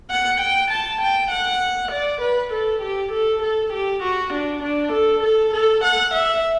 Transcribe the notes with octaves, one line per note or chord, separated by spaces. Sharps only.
F#5
G5
A5
G5
F#5
D5
B4
A4
G4
A4
A4
G4
F#4
D4
D4
A4
A4
A4
F#5
E5